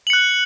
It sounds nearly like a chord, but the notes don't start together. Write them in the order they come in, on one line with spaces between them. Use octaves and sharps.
F#7 C#7 F#6